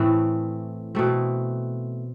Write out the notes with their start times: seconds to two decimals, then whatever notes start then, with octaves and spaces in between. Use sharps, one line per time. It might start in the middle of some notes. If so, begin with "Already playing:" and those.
Already playing: A2 E3 A3 C4
0.95 B2 A3 C4